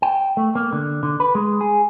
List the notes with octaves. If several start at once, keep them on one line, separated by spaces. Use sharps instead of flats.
G5
A3
A#3
D3
D3
B4
G#3
G#4